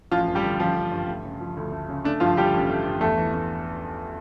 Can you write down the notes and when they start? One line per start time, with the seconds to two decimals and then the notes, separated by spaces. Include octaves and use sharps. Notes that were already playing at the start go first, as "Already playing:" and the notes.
0.11 A1 F3 F4
0.28 G2
0.35 G3 G4
0.43 D3
0.59 A1 F3 F4
0.75 A1
0.91 G2
1.07 A3
1.24 C#3
1.40 F3
1.57 D2
1.72 A3
1.89 C#3
2.04 A3 D4
2.20 G2 F3 F4
2.37 D3 G3 G4
2.54 A1
2.70 A3
2.85 G2
3.01 E2 A3 A4
3.17 E3
3.34 A3